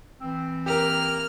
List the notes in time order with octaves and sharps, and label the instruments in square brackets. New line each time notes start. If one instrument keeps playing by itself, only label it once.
[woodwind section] E3 C4
[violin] A#3 F6 [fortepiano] G4 A#4